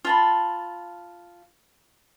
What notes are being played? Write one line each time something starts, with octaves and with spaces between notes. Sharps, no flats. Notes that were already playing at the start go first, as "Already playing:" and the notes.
F4 A5 B5